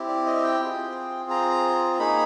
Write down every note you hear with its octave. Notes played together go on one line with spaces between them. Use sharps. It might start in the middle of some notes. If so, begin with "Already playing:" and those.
Already playing: C4 E4 G4
D5
D#5
G5
C4 F4 G#4
A#5
A#3 D#4 G#4 B5